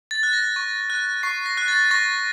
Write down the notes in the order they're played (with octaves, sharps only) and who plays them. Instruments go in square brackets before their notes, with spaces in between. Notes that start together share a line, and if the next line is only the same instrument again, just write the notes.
[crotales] A6
F#6
A#6
C#6
F#6
C#6 C7
A#6
F#6
A6
C#6 A#6